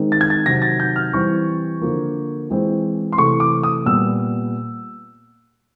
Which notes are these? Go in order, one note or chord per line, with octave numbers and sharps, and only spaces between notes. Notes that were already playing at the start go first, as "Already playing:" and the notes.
Already playing: D#3 G#3 C4
A6
G#6
A6
C3 D#3 F#3 A#6
A6
G6
F6
E3 G3 C4 C#6
D3 F3 A#3
E3 G#3 C4
C6
C3 E3 A3 C#6
D6
D#6
A#2 G3 B3 E6